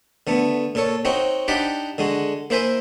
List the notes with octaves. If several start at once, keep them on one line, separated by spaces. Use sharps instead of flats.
D3 A3 B3
A#2 A4 C#5
C4 D#4 F#4 C#5
D4 D#4 G4 D5 F#5 B5
D3 G#3 F#4
A#3 E4 C5 E5 G#5